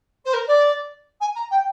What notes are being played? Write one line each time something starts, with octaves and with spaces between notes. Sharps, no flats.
C5
A#4
D5
G#5
A#5
G5